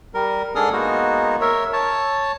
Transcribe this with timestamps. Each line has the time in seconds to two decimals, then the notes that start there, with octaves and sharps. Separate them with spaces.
0.14 G3 A#4
0.55 G#2 D4 G#4 A4 D#6 F6
0.73 G#3 A#3 B3 D#4 F#4
1.41 A#4 C#5 E5
1.73 C#5 A5